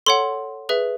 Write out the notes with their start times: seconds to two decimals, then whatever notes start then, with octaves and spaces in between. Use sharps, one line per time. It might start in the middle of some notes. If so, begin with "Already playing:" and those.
0.06 A4 C#5 F#5 C6
0.69 G#4 B4 E5